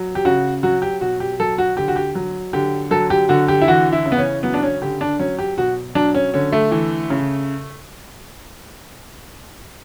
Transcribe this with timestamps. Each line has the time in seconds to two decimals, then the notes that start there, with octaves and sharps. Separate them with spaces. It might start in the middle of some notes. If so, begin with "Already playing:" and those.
Already playing: F#3
0.15 G4
0.25 C#3 F#4
0.63 F#3 F#4
0.82 G4
1.01 B2 F#4
1.20 G4
1.40 F#3 A4
1.58 F#4
1.77 D3 G4
1.88 F#4
1.96 G4
2.15 F#3
2.53 D3 G4
2.91 F#3 A4
3.10 G4
3.29 D3 F#4
3.48 G4
3.62 E4
3.68 E3 F#4
3.93 E4
4.06 C#3
4.12 B3
4.18 C#4
4.43 F#3 B3
4.54 D4
4.63 C#4
4.82 D3 G4
5.01 D4
5.19 F#3 C#4
5.39 G4
5.58 B2 F#4
5.95 F#3 D4
6.15 C#4
6.34 D3 C#4
6.52 A3
6.71 E3
7.10 C#3